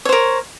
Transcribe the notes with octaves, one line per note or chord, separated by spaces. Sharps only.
A#4 C5 C#5